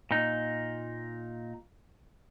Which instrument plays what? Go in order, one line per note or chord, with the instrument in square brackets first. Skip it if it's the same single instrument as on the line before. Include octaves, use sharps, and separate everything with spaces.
[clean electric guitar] A#2 D#4